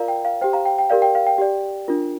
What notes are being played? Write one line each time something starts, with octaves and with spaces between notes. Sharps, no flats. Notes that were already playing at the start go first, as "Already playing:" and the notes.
Already playing: F4 A#4 D5 F5 A#5
G5
F5
G4 C5 G5
F5 A#5
G5
G5
G4 A#4 D5 F5
G5
F5
G5
G4 D5
D4 F4 A#4